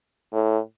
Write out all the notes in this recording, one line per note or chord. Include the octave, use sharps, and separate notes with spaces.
A2